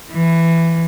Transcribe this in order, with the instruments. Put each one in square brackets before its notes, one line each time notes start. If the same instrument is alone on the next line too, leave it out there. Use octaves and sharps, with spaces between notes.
[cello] E3